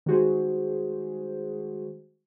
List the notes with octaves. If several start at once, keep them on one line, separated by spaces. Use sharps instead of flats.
D#3 G3 G#3 F#4 G#4 C5